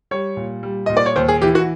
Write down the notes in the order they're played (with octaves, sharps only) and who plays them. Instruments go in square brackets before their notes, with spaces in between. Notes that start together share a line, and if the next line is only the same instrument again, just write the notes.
[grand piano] G3 C#5
A#2
G3
A#2 D#5
D5
C#5
D#2 C5
G#4
E3 G4
F#4